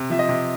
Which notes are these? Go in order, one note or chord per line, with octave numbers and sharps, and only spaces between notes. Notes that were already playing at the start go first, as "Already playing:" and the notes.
Already playing: C3
F3 E5
D#5
C3